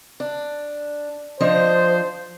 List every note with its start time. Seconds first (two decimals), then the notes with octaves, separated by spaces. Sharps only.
0.20 D4
1.40 F3 D4 C5 D#5